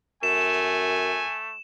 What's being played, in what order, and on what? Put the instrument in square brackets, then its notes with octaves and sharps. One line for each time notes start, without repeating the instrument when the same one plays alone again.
[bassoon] F#2 [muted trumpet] A3 [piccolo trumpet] G#5 [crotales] E7